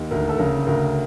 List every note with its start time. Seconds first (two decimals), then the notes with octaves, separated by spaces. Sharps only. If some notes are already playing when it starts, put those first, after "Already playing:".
Already playing: D#2
0.11 D2 A#4
0.29 A4
0.38 C#3 A#4
0.67 D2 A#4